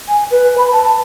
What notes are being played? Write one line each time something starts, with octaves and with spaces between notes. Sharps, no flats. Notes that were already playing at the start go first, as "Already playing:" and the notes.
G#5
B4
B5
A5